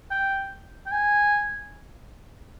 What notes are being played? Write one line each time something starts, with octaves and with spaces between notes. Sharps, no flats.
G5
G5
G#5